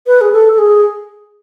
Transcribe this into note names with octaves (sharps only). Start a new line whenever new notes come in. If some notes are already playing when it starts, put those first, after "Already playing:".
B4
G#4
A4
A4
G#4